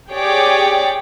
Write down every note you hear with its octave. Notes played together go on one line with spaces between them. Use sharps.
G4 G#4 C#5 D5 G5 D6